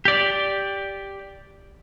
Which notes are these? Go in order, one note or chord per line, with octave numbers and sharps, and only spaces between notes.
G4 D5